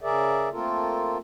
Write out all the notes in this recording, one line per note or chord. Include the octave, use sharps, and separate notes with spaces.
C#3 G#4 A#4 D5 E5
A3 A#3 C4 F4 A4 A#4